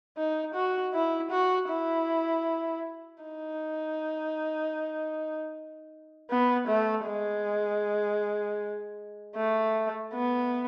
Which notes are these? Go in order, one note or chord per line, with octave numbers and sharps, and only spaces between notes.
D#4
F#4
E4
F#4
E4
D#4
B3
A3
G#3
A3
B3